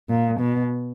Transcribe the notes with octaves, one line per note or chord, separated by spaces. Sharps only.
A#2
B2